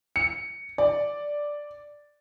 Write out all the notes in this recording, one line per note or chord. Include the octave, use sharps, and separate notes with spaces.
C#7
D5